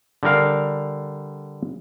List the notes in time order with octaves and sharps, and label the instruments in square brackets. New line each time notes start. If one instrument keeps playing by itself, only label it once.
[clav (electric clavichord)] D3 G3 A#4 F5